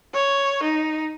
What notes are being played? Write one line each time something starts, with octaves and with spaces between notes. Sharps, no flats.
C#5
D#4